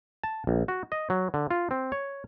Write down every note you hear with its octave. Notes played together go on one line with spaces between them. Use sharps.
A5
A#1
F#4
D#5
F#3
D3
F4
C4
C#5